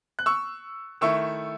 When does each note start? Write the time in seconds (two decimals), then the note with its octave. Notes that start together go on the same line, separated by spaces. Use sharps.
0.19 F#6
0.26 C#6 E6
1.01 D#3 A3 E4 C#6 E6